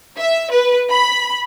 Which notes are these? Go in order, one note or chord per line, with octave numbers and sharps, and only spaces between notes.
E5
B4
B5